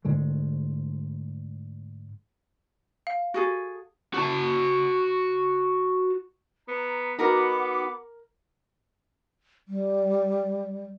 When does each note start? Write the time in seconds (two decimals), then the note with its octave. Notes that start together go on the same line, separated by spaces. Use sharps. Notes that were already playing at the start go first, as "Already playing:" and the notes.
0.05 G#2 D3 G#3 A3
3.07 F5
3.34 F#4 G#4 A4
4.14 F#4 A5
6.68 B3 A#5
7.19 B3 D#4 F#4 A#4 F#5 A#5 B5 D6
9.68 G3